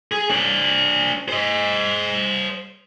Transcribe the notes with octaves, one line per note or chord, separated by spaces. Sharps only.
G#4
D4 C5
C5 D#5